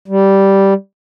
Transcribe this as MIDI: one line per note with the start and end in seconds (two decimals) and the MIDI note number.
0.08 0.74 55